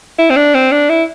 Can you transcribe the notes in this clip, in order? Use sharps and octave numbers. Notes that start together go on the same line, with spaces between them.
E4
C4
D4
C4
D4
E4